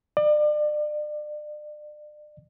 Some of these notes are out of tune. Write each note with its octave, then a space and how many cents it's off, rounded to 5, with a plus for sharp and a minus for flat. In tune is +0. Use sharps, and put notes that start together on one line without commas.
D5 +35